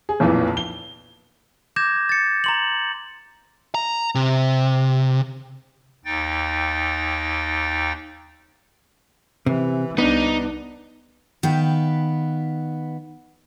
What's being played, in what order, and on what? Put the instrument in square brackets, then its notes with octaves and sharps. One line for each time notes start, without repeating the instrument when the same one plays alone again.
[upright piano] G#4
B1 F2 A#2 E3 B3
G7
[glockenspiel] D6 G6 G#6 A#6 E7
A6 C#7
A#5 C6 F#7
[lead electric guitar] A#5
C3
[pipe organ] D#2 D#4 G5 A6
[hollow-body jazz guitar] C3 [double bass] E3
[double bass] C2 D4 [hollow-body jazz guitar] B3 [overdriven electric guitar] D#4
[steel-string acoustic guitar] D#3 B3 B4 F5 G5